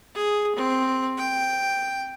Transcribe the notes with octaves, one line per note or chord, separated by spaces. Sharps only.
G#4
C4
G5